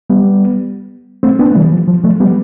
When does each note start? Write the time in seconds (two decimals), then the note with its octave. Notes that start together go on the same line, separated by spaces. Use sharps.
0.10 G3 B3
1.23 A3 C4
1.39 B3 D4
1.51 A3
1.55 E3 G3
1.72 F3
1.88 F3
2.04 F3 A3
2.20 G3 B3